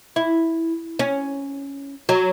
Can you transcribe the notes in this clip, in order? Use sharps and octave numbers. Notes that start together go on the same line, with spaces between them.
E4
C#4
F#3